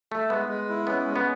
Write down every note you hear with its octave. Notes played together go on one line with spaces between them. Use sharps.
A3 E5
G#3 B3
G#3
E4
B3 C#4
G#3
B3